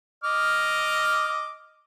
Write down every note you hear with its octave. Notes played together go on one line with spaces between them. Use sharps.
D#5 D6 F6